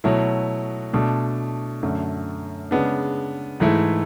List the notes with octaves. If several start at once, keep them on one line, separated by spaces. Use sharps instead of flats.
B2 F#3 A3 E4
B2 A3 D4
F#2 D3 A3
C#3 G#3 B3 D4
G#2 E3 A3 E4